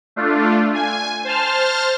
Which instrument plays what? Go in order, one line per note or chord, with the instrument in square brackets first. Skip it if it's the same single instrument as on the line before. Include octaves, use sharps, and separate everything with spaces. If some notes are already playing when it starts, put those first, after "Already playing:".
[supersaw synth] A3 D4 F4
G#5
C5 A5 F6